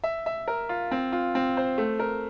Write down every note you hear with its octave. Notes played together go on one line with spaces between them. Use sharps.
E5
E5
A#4
F4
C4
F4
C4
C5
A3
A#4